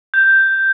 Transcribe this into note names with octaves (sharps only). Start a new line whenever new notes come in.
G6